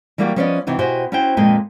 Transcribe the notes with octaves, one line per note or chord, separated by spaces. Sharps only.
E3 G3 A#3 D4 F#4 G4
F3 B3 C#4 B4 D5 D#5
C3 E3 D#4 F#4
B2 E4 F#4 G4 C5 G#5
C#4 E4 F#4 C5 G5
F2 A#2 G#3 B4 D#5 G5